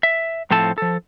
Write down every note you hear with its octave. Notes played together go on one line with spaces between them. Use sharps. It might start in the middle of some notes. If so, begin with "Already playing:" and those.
E5
A2 F3 C4 F4 A4 A5
F3 A4